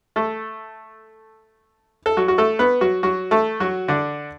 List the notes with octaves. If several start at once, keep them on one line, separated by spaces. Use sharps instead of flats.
A3 A4
A4
F#3 F#4
F#4
A3 A4
B3 B4
F#3 F#4
F#3 F#4
A3 A4
F#3 F#4
D3 D4